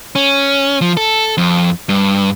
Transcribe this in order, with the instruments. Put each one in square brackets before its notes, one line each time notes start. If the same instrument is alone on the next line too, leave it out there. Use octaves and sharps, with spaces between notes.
[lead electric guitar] C#4
F3
A4
F2
G2